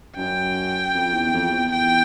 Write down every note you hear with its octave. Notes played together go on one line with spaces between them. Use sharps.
F#2 G5
F2
E2
F2
E2
G5